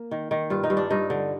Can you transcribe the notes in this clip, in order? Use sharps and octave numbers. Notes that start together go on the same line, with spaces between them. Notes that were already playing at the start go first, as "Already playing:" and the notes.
Already playing: A#3
D#3
D#3
G2 F4
D#4
G2
D4
G2 D#4
D3